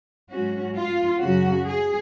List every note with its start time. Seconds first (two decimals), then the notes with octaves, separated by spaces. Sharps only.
0.31 G#2 F#3 C#4 F#4
0.76 F4
1.21 F#2 C#3 F#3 C#4 F#4
1.67 G#4